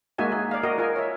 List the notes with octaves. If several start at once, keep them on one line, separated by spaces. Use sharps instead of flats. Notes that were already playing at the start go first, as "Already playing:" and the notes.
G#3 A#3 D#4 F#4 E5 G#5
G#4
D5 F5
F#4 A#4 D#5 G5
F4 A#4 G#5
C#5 E5